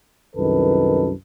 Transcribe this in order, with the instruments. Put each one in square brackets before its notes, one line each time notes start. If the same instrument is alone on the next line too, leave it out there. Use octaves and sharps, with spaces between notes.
[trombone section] C2 F#2 D#3 A4 B4